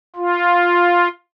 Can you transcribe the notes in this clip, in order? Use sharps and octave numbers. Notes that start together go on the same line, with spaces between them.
F4